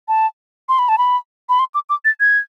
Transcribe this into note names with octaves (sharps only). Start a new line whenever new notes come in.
A5
C6
B5
A5
B5
B5
C6
D6
D6
A6
G#6